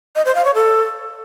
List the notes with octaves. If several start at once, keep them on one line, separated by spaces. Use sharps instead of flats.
D#5
C5
F5
C#5
A4